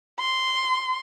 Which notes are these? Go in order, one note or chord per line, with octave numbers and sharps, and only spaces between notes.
C6